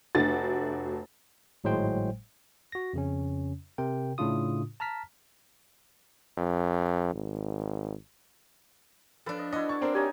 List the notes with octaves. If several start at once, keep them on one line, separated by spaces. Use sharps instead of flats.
F1 A3 D4 F#4 A6
G#1 A2 F#3 G#3 C5 G5
F#4 A#6
F2 C#3 C#4
C3 A#4 G5
A2 C#3 D4 F4 D#6
A5 A#5 F6 B6
F2
G#1
F3 D4 A4 B4
D#5
D4 E4 F#4 D#5
A5 C#6
C4 D4 A#4 C5
D#4 G4 C#5 G#5